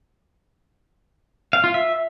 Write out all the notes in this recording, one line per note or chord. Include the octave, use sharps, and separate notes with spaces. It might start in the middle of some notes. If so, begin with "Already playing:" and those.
F5
F4
E5